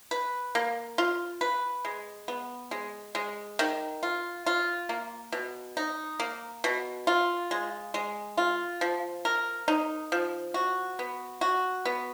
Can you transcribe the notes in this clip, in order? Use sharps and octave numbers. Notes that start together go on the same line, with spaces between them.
B4
A#3
F4
B4
G#3
B3
G#3
G#3
D#3
F4
F4
A#3
B2
D#4
A#3
B2
F4
G#3
G#3
F4
F3
A#4
D#4
F3
F#4
B3
F#4
B3